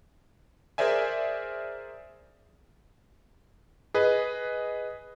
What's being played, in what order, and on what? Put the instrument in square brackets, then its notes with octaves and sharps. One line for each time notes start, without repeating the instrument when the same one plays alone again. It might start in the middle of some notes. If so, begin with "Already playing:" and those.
[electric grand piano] G#4 A#4 C5 D5 E5 G#5
G#4 B4 D#5